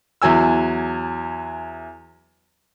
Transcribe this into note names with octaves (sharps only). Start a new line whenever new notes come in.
E2 F#3 G#5 E6